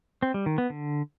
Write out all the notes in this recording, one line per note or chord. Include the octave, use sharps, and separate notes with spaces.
C4
G3
D#3
B3
D3